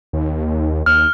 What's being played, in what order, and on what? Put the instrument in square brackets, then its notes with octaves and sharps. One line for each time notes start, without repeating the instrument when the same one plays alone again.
[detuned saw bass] D#2
[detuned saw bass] D#2 [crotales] F6